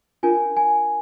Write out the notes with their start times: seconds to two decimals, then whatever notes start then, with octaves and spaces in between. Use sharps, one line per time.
0.23 D4 F4 A#4 G#5
0.57 G#5